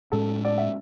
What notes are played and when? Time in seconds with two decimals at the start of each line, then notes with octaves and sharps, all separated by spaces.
0.12 A2 G#3 C#4 A4
0.45 D5
0.58 E5